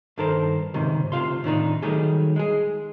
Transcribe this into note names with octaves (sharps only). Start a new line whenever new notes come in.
G2 D#3 A4 A#4 C5
C#2 G#2 C3 D#3
D2 C3 B3 F4 F5 C6
A2 D#3 D4 D#4
D#3 F#3 G3 A3 G#4
G#3 G#4